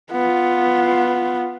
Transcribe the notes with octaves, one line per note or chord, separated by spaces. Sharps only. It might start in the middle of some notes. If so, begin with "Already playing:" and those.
B3 F4